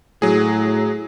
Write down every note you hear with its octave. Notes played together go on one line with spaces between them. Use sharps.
A2 F#3 G#4